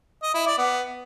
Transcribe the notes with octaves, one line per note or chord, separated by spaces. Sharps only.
D#5
E4
D5
B3